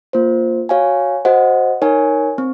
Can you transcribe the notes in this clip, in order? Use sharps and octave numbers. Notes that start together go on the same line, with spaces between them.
A#3 F4 C5
F#4 C#5 F5 G#5
F#4 C5 D#5 F#5
D#4 A#4 C#5 G#5
C4